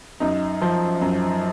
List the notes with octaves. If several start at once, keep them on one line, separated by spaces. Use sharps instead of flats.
F#2 D#4
F3
F#2